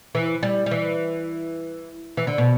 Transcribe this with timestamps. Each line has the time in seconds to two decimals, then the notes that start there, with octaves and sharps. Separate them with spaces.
0.15 E3
0.43 G3
0.66 G3
0.71 E3
2.17 E3
2.27 D3
2.38 B2